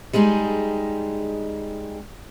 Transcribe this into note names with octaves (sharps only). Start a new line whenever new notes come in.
G3 G#3 D#4 G#4